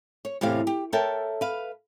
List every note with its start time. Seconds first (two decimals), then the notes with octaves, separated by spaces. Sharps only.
0.25 C#5
0.41 E2 A2 C3 G4 F5
0.67 G4
0.93 A4 A#4 C#5 E5 G5 A5
1.41 B4 F5